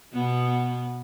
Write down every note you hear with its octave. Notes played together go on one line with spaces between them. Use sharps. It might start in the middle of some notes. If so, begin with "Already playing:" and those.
B2 B3